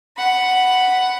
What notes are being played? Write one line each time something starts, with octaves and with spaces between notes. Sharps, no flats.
F#5 B5